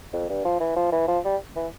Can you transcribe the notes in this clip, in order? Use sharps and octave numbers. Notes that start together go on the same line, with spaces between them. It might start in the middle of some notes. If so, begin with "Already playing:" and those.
F2
G2
F3
E3
F3
E3
F3
G3
E3